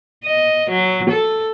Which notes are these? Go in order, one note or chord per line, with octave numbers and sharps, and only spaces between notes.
D#5
F#3
A4